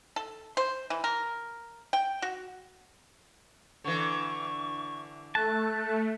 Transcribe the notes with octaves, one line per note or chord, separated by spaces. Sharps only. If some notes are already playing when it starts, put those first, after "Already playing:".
A4
C5
E3
A#4
G5
F#4
D3 E3 C#6
A3 A5 F#6